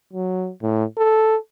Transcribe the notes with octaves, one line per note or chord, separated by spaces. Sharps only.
F#3
A2
A4